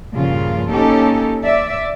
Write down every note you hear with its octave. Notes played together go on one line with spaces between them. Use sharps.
G2 A#2 C#3 F3 F4
A#3 C#4 D#4 G4 A4
D5 E5